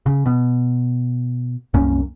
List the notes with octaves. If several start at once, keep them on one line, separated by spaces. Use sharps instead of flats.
C#3
B2
C2 F#2 A#3 C#4